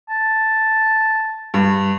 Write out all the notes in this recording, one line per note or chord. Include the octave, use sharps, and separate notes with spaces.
A5
G2